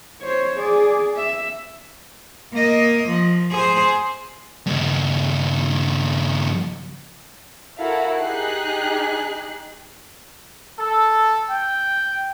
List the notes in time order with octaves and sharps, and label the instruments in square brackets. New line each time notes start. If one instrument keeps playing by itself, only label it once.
[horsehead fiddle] C5 C#5
G#4 D5
E5
[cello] A#3 D#5
F3
G#4 C5
[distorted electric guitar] G2 C#3
[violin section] E4 F#4 A4 A#4 F5
D#4 G4 G#4 F#6 C7
[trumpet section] A4
G5